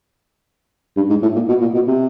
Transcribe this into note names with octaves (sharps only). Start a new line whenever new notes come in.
G2
G#2
A2
A#2
B2
A#2
B2
C3